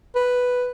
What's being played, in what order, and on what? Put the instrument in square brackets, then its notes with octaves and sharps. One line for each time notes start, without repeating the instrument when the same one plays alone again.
[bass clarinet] B4